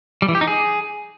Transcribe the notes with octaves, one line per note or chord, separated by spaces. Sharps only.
G3
E3
G4
D#4
G#4